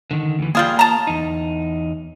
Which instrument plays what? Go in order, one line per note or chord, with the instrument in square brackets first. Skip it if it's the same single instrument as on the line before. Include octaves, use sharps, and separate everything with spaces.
[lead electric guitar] D3 D#3
D2 E3
[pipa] G3 F4 G#4 [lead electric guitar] A#3 C6
[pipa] A5 A#5
[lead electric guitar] E2 D#4